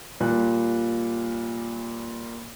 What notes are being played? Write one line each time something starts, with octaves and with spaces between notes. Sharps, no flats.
A#2 G3 F#6